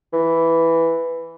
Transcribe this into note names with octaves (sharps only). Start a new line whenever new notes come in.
E3